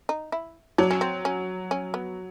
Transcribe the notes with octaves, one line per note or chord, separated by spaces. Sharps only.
D#4
E4
F#3 D4
C#4
C4
C#4
C#4
B3